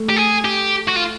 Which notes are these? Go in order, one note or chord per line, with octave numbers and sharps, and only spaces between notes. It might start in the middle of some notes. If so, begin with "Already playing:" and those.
Already playing: A3
G4
G#4
G4
F#4
F4